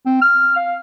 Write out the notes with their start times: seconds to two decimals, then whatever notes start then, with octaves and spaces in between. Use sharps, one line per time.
0.06 C4
0.22 F6
0.56 F5